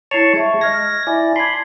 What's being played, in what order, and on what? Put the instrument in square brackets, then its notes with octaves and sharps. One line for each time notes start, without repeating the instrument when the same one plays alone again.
[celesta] E4 C7 F7 [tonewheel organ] C#5 A5 C#6
[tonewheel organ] G#3 [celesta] E5 A5 C#6
[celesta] D#5 F6 G#6 [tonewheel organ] A#6
[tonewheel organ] E4 D5 [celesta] G#5
[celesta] A5 G#6 [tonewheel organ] B5 C6